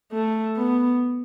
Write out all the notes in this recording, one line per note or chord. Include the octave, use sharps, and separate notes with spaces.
A3
B3